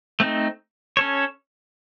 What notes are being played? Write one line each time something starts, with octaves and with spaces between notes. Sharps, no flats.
A3 C4 D#4
C#4 A4 C#5